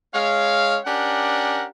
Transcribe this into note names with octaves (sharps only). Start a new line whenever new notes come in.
G#3 C#4 C#5 F5
C#4 D4 G4 A#4 F#5